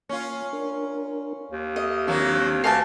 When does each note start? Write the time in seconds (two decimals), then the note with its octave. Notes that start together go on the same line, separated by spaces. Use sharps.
0.09 A#3 C#4 F4
0.53 D4 A#4
1.52 D#2
1.76 A4 D#5 E5
2.07 D#3 F3 F#3 A#3 C4 D4
2.64 D2 A4 B4 F5 F#5 G#5 A5